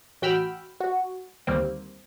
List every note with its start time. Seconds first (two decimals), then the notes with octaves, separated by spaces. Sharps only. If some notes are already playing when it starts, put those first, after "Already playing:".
0.22 A1 F#4 G5 B5 E6 F6
0.80 F#4
1.47 D2 D#3 G3 A#3 C4